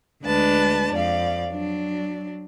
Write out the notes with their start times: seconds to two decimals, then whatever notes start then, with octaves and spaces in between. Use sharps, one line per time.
0.24 D2 G#3 D4 B4 A5
0.93 F2 D5 F5
1.52 F#3 D4